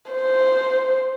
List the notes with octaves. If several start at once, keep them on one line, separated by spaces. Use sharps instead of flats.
C5